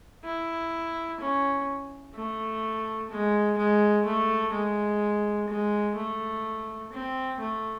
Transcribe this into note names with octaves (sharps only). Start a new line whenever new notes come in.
E4
C#4
A3
G#3
G#3
A3
G#3
G#3
A3
C4
A3